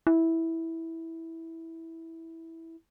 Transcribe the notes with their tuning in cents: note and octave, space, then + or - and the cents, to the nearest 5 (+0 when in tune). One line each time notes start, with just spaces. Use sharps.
E4 -10